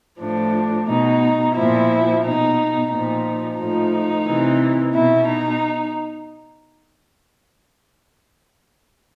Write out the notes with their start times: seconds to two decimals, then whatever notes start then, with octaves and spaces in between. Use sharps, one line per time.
0.20 A2 F3 D4
0.88 B2 D#4
1.55 A#2 F3 E4
2.23 B2 D#4
2.90 A#2 F3 D#4
3.58 A2 F3 D#4
4.26 C3 E3
4.94 B2 E4
5.27 D#4